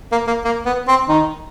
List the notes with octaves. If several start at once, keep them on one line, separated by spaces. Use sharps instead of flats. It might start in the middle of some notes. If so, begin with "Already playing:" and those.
A#3
A#3
A#3
B3
C4
D#3 D#4